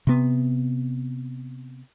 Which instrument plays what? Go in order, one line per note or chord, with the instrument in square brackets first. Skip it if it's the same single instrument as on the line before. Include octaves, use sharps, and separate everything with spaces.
[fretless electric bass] C3 B3